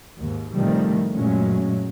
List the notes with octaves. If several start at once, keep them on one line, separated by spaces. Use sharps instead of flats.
D#2 G#2
A2 C3 D#3 F3 G3 A3
F#2 A#2 F#3 G#3 A3 C#4